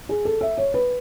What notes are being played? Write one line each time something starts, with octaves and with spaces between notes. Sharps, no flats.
G#4
A4
E5
C#5
B4